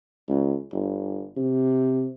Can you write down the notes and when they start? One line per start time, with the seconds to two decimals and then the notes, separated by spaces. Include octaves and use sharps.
0.29 C#2
0.72 G1
1.37 C3